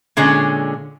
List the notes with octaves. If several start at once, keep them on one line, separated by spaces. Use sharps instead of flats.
A#2 D3 G#3 C#4